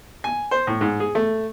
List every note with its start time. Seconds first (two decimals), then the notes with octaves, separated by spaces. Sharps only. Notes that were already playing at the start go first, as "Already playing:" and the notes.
0.24 G#5
0.51 C5
0.67 A2
0.81 G#2
1.00 G#4
1.15 A3